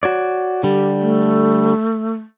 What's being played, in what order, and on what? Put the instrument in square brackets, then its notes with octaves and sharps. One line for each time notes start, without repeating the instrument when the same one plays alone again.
[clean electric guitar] F#4 C#5 D5
[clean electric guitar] D3 G3 [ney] G4
[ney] A3